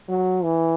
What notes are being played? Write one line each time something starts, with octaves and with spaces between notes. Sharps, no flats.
F#3
E3